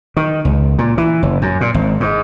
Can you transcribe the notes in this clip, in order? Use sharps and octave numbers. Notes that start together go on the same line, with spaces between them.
D#3
C#2
A#2
E3
F#1
F#2
A#2
G#1
G#2